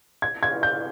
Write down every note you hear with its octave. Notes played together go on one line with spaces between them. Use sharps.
G#6
G#6
G6